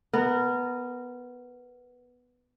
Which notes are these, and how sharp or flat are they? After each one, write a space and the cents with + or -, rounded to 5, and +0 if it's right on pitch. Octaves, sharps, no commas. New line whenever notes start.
B3 +0 A#4 -20